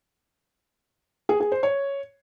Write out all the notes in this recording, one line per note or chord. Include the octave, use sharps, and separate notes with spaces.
G#4
G#4
C5
C#5